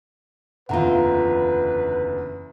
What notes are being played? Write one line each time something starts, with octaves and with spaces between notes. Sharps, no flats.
F#1 E2 D3 F4 B4 F#5 A#5